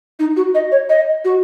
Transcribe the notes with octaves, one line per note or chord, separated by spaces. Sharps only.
D#4
F#4
D#5
C#5
D#5
F#4